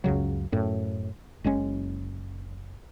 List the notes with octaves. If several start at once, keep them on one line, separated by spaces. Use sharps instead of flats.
C#2 F#2 C#3 F#3
F#2 A2
F#1 G#3 C#4